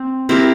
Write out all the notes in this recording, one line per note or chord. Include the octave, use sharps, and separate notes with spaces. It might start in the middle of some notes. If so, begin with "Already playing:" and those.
Already playing: C4
C4 E4 G4 A#4